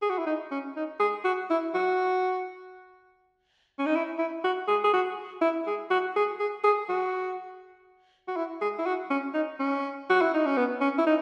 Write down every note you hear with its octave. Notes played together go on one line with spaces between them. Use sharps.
G#4
F#4
E4
D#4
C#4
D#4
G#4
F#4
E4
F#4
C#4
D#4
E4
E4
F#4
G#4
G#4
F#4
E4
G#4
F#4
G#4
G#4
G#4
F#4
F#4
E4
G#4
E4
F#4
C#4
D#4
C#4
F#4
E4
D#4
C#4
B3
C#4
E4
D#4